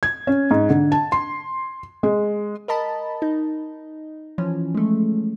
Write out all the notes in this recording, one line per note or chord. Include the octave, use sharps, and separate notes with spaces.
G#6
C#4
G#2
D3
A5
C6
G#3
A#4 D#5 A5 B5
D#4
E3 F3 C#4
G#3 A3